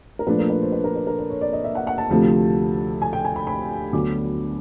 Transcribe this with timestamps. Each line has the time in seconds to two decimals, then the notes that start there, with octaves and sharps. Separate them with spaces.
0.19 A#4
0.27 A#2 F3 A3 D4 B4
0.39 A#4
0.50 B4
0.61 C5
0.72 B4
0.84 A#4
0.95 B4
1.07 A#4
1.19 B4
1.30 C#5
1.41 D5
1.53 D#5
1.64 E5
1.75 F#5
1.87 F#5
1.98 A5
2.10 D2 C3 F3 A3
3.02 G#5
3.13 G5
3.25 G#5
3.36 B5
3.47 B5
3.93 D2 D3 F#3 B3 D6